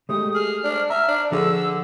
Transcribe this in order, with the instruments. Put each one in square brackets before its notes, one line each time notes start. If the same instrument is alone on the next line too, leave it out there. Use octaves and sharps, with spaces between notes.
[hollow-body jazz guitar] G#3 A3 G4 [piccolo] D#6
[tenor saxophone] G#4 [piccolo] F6
[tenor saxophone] D4
[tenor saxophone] E5 [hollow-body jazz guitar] A#5 [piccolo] F6
[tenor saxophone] D4
[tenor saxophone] D3 [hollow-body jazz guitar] F3 G#4 [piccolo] E6